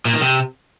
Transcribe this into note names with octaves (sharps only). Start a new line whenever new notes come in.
A#2
D#3
C3